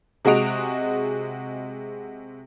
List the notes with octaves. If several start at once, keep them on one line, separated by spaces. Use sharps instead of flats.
C3 G#3 F#4 D#5 D7 F7